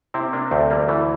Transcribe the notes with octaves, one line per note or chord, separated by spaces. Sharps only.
C3 C4 E4
A#3 D4
D2 A3 C4
G3 A#3
E3 A3